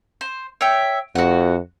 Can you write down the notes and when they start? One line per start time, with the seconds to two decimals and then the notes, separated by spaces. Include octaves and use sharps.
0.21 C5
0.61 C#5 E5 G5
1.15 F2 F#4 F#5